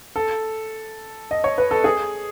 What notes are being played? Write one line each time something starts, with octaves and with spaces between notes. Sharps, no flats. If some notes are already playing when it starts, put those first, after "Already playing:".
A4
D#5
C#5
B4
A4
G#4